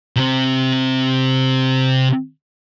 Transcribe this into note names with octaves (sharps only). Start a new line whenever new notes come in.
C3 C4